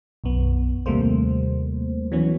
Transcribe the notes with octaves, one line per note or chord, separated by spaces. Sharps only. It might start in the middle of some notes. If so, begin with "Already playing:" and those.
B1 F#2 B3
D#2 C3 G3 A3 A#3 C5
E3 F#3 B3 C#4